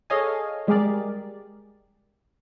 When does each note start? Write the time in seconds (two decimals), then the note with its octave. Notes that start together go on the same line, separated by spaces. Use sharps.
0.10 G#4 A4 C#5 D#5 F5 G#5
0.67 G3 G#3 G4 G#4 A#4 D5